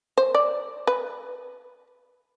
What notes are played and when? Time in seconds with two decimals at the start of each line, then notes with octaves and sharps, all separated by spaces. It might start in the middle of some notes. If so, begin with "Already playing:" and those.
0.18 C5
0.35 D5
0.87 B4